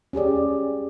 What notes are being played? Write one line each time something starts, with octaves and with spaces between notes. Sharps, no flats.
C#4 G4 G#4 D5